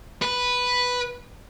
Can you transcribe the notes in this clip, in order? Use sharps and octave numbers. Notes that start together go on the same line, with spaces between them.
B4